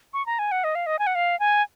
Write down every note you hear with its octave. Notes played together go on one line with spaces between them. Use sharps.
C#6
A#5
G#5
F#5
D#5
F5
D#5
G#5
F#5
F5
G#5